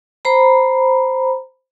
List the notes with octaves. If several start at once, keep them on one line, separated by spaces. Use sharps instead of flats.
C5 A#5 B5